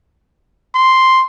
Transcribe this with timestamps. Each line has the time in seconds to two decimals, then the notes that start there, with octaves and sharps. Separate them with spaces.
0.75 C6